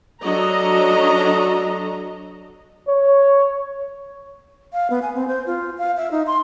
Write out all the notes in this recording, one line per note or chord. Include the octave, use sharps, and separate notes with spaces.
F#3 D4 F#4 A4 D#5 A#5
C#5
F5
B3
G#5
C4
C5
F4
F5
E5
D#4
C6